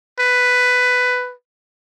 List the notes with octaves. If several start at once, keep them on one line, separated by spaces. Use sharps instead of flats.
B4